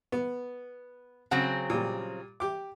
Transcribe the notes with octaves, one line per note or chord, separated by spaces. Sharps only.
B3
C#3 F#3 C4 F#5
A#2 G3
G4 D6